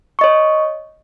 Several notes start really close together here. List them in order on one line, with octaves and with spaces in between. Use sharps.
C#6 D#5 C#5